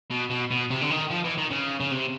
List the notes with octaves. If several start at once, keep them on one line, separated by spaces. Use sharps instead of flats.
B2
B2
B2
C3
D3
D#3
F3
E3
D#3
C#3
C#3
C3